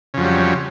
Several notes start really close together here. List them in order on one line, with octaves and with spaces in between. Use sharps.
C#3 F2 F#3 G3